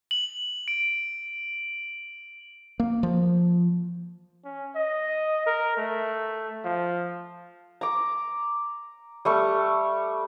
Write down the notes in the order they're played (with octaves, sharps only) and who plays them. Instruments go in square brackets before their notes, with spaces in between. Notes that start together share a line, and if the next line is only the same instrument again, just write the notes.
[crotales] F#7
D7
[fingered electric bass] A#3
F3
[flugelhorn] C#4
D#5
A#4
A3
F3
[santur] A#5 D6
G3 A3 C#6